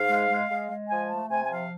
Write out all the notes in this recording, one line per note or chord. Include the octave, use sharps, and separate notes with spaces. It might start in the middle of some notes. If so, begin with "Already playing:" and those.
Already playing: G#2 F5
G#3
G#3
G#3
G#3
F3 G#5
A3 A5
C3 G#5
G#5
F3 F5